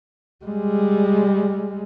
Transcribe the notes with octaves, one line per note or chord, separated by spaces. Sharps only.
G3 G#3